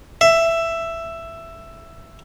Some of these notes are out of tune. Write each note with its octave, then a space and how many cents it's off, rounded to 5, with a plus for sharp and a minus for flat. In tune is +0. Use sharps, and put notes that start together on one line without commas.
E5 +10